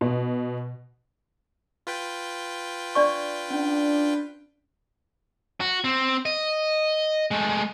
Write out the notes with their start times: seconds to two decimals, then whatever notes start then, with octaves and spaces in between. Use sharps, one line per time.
0.01 B2
1.87 F4 B4 G5
2.95 D4 D5 C#6
3.51 C#4 D4
5.60 F#4
5.84 C4
6.25 D#5
7.31 G#3 A3